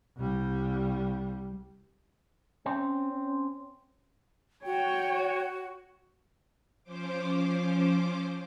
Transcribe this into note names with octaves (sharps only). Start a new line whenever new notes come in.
C2 G3
C4 C#4
C#4
F#4 C#5 G5
F3 C#4 C5 D6